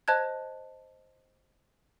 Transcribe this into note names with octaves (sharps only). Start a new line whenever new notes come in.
C5 D#5 A5 F#6 G#6